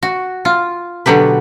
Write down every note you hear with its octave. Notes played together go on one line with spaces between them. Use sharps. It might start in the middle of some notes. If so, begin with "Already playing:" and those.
F#4
F4
B2 D3 F#3 G4 B4